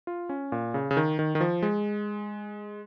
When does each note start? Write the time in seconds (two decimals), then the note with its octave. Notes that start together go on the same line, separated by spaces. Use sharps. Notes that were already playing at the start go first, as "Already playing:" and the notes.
0.07 F4
0.29 C#4
0.52 A#2
0.74 C#3
0.91 C#3
0.97 D#3
1.19 D#3
1.35 D#3
1.41 F3
1.63 G#3